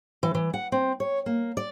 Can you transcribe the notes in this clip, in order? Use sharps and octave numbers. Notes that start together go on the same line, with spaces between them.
E3
E3
F#5
C4
C#5
A#3
D5